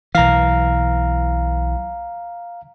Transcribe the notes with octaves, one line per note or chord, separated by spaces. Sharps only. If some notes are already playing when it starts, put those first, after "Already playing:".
B1 E3 F5 A#5